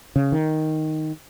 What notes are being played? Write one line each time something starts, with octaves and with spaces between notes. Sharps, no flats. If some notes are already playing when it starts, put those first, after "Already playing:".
C#3
D#3